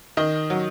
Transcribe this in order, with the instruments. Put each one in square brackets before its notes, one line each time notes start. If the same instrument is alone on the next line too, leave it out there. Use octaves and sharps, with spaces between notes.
[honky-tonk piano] D#3 D#5
F#3